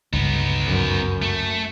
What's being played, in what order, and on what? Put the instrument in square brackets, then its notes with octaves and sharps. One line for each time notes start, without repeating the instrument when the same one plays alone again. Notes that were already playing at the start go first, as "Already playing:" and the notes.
[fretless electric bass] G1 C#2 [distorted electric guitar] B3 D#4
[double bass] F#2
[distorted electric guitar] A3